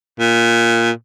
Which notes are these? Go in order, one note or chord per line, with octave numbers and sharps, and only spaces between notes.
A#2